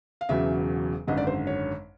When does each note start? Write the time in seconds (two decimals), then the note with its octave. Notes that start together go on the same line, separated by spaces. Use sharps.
0.21 F5
0.29 E1 E2 C#3 F#3 E5
1.07 G#1 F#2 D3 D#5
1.17 D5
1.27 C5
1.47 C#5